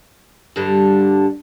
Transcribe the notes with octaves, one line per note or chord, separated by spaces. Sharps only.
G2 D3 G3